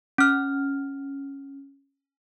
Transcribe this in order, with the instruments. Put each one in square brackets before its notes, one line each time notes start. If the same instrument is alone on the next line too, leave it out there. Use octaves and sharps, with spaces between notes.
[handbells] C#4 F6